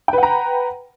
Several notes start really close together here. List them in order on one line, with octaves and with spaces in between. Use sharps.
G5 B4 F#5 A#5